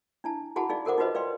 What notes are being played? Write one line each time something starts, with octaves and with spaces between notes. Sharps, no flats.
D4 E4 A5
E4 F#4 G#4 F#5 A5 B5
D#4 G#4 D5 F5
F#4 A4 A#4 C5 F#5 D6
D#4 F4 F#4 B4 C5 D#5
B4 D5 F5 G5 C6